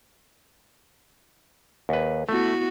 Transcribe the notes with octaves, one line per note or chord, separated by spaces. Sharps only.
D#2 B4
A3 B3 E4 F#4